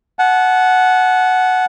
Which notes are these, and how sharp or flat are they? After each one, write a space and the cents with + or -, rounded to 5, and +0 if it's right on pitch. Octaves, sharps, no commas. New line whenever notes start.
F#5 +0 A5 -35